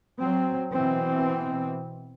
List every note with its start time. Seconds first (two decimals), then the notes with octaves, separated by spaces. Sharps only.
0.18 F#3 C4
0.73 B2 E3 C4